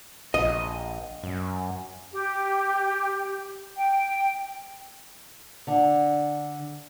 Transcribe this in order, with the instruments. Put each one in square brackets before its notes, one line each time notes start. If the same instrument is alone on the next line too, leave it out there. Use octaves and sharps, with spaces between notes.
[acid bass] A#1 [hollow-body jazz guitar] D#5
[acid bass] F#2
[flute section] G4
G5
[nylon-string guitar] D3